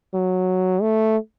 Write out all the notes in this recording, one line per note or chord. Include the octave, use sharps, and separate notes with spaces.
F#3
A3